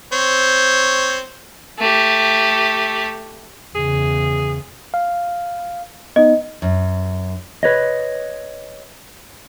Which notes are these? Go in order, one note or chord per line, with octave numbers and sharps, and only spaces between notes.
C4 C#5
A3 G4
E2 C#3 G#4
F5
B3 D#4 D#5
F#2
B4 C#5 D#5